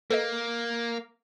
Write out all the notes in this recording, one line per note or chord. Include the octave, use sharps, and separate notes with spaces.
A#3 A4 B4 D#5